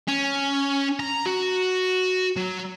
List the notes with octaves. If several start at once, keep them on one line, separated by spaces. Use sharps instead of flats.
C#4
A#5
F#4
F#3